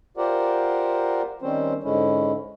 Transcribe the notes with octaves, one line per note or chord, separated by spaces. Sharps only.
F4 G4 A#4 C5 D5 F#5
D#3 G3 C4 C#4 C5
G#2 D3 G#3 C#4 E4